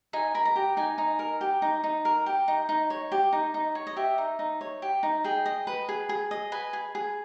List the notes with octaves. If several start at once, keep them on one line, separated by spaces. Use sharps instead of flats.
D#4 G#5
A#4 B5
A#5
G4
D#4 G#5
D#4
A#4
G4
D#4
D#4
A#4
G4
D#4
D#4
C#5
G4
D#4
D#4
C#5
D#5
G4 E5
D#4
D#4
C#5
G4
D#4
G#4 G5
D#5
B4
G#4
G#4
D#5
B4 G#5
G#4
G#4